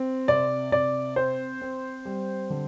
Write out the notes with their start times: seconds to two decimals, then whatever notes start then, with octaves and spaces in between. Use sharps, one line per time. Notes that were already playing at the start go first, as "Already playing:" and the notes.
Already playing: C4
0.28 C3 D5
0.72 C3 D5
1.16 C4 C5
1.62 C4
2.05 G3
2.50 D3